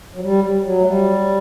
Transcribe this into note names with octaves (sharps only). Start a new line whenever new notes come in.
F#3
G3
F#3
A3
G3